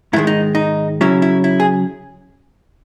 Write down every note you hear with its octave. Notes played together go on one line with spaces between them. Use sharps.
G#2 D#3 G#3 E4
D#4
D#4
C#3 F#3 C#4 E4
E4
E4
G#4